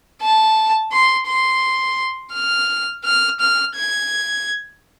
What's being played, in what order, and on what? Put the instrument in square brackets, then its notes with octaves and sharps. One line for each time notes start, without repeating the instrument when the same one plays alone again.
[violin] A5
C6
C6
F6
F6
F6
G#6